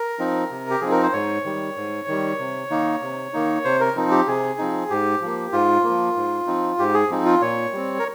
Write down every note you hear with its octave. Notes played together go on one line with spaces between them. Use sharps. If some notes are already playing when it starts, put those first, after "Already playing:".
Already playing: A#4
F3 C4 D#4
C3
G4
F3 C4 D#4 G#4
A#4
C5
G#2 C#5
D#3 G3
G#2
D#3 G3
C3
D#3 A#3 D#4
C3
D#3 A#3 D#4
C3 C5
A#4
F3 C4 D#4
G4
C3 G#4
F3 C4 D#4
G#2 G4
F3 A#3
G#2 F4
F3 A#3
G#2
F3 C4 D#4
G#2 G4
G#4
F3 C4 D#4
F4
A#2 C#5
G3 C4
A#4